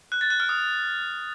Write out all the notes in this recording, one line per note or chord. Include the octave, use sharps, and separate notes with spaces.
F#6
A6
F#6
F6
D#6